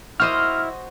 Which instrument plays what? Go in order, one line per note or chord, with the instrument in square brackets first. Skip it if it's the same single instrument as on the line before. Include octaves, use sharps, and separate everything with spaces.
[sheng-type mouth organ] E4 [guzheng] F#4 C5 D#5 [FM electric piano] F6